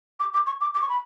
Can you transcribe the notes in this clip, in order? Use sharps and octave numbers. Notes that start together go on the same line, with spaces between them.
D6
D6
C#6
D6
D6
C#6
B5